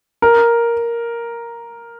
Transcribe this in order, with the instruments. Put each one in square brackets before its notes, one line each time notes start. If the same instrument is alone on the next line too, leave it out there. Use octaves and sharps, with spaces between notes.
[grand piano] A#4